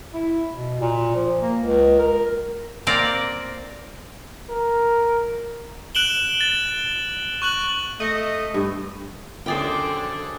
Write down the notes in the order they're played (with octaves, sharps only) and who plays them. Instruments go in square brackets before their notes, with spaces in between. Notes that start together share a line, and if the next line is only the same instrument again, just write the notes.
[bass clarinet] E4
B2
A#2
F3
A#3
C#2
A#4
[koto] A#3 C4 A#4 D5
[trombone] A#4
[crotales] F#6 D7 E7 F#7 G7
A6
C#6 F#6 F#7
[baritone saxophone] A3 [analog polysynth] D#5
[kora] G2
[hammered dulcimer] F#2 G4 G#4 [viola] D3 D4 [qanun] C5 D5 G5